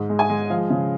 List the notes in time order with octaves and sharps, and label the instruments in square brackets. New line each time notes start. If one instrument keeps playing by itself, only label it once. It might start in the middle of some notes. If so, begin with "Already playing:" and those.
Already playing: [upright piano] G#2
G#3
G#5
G#3
F3 F5
C#3